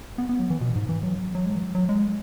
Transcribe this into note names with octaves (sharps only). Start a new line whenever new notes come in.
B3
B3
F#3
E3
B2
G#2
E3
F#3
F#3
G#3
E3
F#3
F#3
G#3